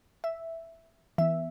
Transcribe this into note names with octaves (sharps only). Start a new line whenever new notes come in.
E5
E3 B3 E5